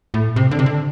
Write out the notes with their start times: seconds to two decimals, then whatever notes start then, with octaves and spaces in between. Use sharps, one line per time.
0.14 A2
0.36 C3
0.51 D3
0.59 C3
0.66 D3